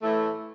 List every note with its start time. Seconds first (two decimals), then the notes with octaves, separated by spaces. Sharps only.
0.02 A2 E3 A3